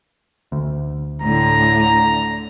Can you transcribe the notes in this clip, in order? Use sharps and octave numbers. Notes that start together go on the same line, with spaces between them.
D2
A2 D3 A#5